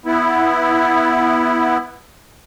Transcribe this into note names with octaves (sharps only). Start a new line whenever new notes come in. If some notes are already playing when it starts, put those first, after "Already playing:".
B3 E4